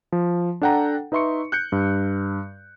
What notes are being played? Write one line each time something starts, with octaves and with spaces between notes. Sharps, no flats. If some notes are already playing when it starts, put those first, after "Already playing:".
F3
D4 A4 F#5 G5 A#5
D#4 B4 E5 C6 C#6 C#7
F#6 G6 C#7
G2